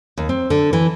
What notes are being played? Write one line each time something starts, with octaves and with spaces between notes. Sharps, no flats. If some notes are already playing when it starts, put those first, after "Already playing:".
D#2
C4
D3
E3